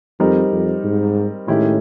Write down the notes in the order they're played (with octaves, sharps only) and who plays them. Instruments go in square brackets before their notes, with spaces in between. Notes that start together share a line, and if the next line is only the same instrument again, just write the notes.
[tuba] F2 [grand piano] G3 C4 D#4 G4 A#4
[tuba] F2
G#2
[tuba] A2 [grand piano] D#3 G#3 C#4 E4 G4